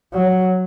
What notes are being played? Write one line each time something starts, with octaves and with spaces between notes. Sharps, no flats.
F#3